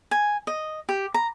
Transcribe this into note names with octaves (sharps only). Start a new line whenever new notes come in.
G#5
D#5
G4
A#5